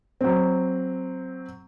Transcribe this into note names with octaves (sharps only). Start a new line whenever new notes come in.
F#3 C4